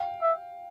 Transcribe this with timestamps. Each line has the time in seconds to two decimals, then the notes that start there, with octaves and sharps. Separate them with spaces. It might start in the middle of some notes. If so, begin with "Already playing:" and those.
Already playing: F5 G5
0.22 E5